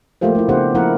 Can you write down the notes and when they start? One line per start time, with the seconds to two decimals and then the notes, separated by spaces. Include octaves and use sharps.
0.21 F3 A3 A#3 F4 G4 C5
0.35 A3 E4
0.49 C#3 B3 D4 G4 C5 F#5
0.74 F3 A#3 E4 A4 A#4 F#5